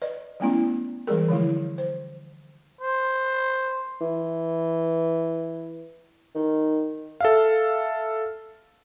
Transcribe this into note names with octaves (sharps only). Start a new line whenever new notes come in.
B4 D5 D#5
F#3 G#3 A3 B3 C#4 E4
E3 G3 G#3 G#4 A#4
D3 F3 G#3 E4
C5
C5
E3
D#3
A4 E5 F5